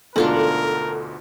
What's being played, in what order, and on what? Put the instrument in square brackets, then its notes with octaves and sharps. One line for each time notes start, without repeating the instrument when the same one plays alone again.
[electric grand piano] D2 G#2 B2 [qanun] D4 F4 F#5 [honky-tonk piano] A4 [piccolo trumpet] A#4